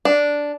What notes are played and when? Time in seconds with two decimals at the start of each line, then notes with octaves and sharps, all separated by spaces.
0.05 D4